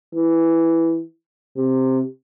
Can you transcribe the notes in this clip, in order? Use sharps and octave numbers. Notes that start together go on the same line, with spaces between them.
E3
C3